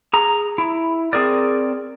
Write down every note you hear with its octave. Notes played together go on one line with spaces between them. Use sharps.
G#4 A#5
E4
C4 G#4 A#4 D5